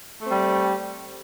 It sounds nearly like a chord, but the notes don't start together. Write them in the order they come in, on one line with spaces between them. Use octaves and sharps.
A3 C4 G3